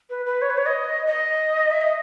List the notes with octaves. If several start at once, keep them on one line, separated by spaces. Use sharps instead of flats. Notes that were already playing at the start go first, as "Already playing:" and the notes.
B4
B4
C#5
B4
C#5
D#5
D#5
E5
D#5